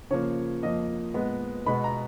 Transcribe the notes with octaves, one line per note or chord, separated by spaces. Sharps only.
C#3 F3 A#3 C#5
F2 F3 A#3 D#5
A#2 G#3 B3
B2 G#3 B3 B5
A#5